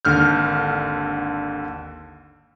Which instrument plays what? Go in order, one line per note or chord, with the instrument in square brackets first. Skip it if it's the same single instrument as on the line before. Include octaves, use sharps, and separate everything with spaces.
[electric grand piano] G#1 D#2 D3 F6 G6